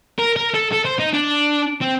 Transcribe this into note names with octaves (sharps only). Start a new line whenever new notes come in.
A#4
A#4
A4
A4
C5
D#4
D4
C4